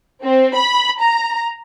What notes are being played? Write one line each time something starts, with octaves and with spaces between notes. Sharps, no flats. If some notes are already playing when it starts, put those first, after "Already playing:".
C4
B5
A#5